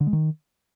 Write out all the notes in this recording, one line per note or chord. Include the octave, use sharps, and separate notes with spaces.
D3
G#3
D#3